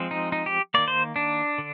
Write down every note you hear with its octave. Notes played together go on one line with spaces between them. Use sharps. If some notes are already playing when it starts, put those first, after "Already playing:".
Already playing: F3 G#3 C4
D#4
D#4
G4
D#3 A#3 D5
C5
D4
D3